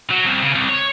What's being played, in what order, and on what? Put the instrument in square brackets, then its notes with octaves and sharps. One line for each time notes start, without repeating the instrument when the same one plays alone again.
[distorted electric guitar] F#3
C2
C#3
C2
C#5